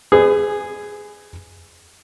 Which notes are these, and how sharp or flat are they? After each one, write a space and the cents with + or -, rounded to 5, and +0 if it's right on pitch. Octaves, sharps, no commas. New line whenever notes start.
G#4 +0 B4 +35